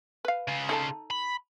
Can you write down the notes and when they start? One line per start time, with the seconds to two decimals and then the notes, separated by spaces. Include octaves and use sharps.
0.25 B4 F5
0.48 C#3 F4
0.69 D#4 A4 A5
1.10 B5